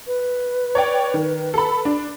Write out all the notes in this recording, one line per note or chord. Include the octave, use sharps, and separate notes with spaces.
B4
C#5 D5 G5
D#3
A4 B5
D4